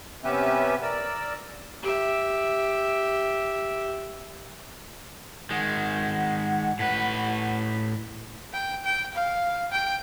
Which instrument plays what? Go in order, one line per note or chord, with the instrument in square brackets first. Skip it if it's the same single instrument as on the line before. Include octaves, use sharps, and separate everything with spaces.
[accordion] C3 B3 C#4 G4 B4 E5
A#4 D5 E6
[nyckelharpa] G4 E5
[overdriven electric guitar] D#3 G#3 [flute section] F#5
[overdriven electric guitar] A2 B4
[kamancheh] G5
G5
F5
G5